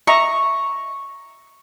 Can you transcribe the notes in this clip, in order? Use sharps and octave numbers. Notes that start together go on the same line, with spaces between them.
D#5 E5 A#5 C#6